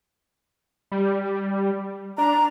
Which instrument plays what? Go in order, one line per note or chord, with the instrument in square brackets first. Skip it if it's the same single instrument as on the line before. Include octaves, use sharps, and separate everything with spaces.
[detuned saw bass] G3
[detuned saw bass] D4 [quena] A#5